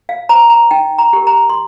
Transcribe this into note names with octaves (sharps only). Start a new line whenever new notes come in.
F5
C5 A#5
A#5
D#4 G5
A#5
G4 A#4
A#5
C6